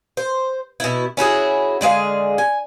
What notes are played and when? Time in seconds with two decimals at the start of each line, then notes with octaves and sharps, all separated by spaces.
0.17 C5
0.80 B2 E4
1.17 C#4 E4 F#4 G#4
1.81 D3 G#3 G#4 F5
2.38 G#5